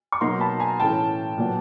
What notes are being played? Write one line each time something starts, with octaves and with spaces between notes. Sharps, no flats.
C#6
B2 F#3 A#3 D#4 A#5 C6
A5 B5
G#5 A#5
A2 E3 A3 C#4 G5 A5
A#2 F#3 B3